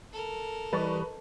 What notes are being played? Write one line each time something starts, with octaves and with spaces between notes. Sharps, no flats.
A4 A#4
E3 G3 B4 D5 D#5 C#6